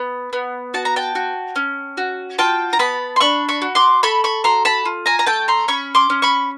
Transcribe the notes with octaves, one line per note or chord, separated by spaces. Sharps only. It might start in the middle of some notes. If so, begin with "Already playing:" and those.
Already playing: B3
B3
F#4 A5
A#5
G5 A5
F#4
C#4
F#4
F4 G5 A5
A#5
B3 A5 B5
C6
D4 B5 C#6
B5 C#6
F#4
C6 D6
A4 B5 C#6
B5 C#6
F#4 A#5 C6
A5 B5
F4
G#5 A#5
A#5
A3 G5 A5
A#5 C6
C#4 B5 C#6
C6 D6
C#4
B5 C#6